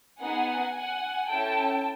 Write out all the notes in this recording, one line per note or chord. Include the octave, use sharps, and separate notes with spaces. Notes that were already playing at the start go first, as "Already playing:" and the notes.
B3 D#4 G#4 F#5 G#5
F#5 G#5
C#4 E4 A4 G5 A5